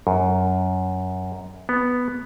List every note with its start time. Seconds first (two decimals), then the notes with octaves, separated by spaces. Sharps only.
0.07 F#2
1.69 B3